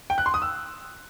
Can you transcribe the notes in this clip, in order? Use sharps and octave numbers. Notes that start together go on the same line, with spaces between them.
G5
F#6
C6
D#6
E6